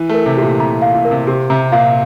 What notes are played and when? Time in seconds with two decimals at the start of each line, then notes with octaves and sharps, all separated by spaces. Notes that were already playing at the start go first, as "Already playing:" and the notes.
Already playing: E3
0.09 A3 A#4
0.26 C3
0.37 A#2 G4
0.59 C3 A#5
0.82 F5
0.94 A#2
1.05 A#4
1.11 C3
1.27 C3 G4
1.50 C3 A#5
1.72 A#2 F5